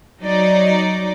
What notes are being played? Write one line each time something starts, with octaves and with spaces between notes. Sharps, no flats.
F#3 D#4 D5